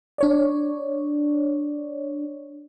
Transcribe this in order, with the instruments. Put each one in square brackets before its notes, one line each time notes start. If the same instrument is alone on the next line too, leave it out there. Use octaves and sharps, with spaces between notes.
[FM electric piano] D4 C#5 D5